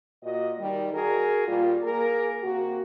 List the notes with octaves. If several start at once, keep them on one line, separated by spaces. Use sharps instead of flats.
A#2 F#4 D#5
D#3 G3
F#4 G#4 A#4
A#2 G3 F4
A#3 G#4 A#4
C3 A#3 F#4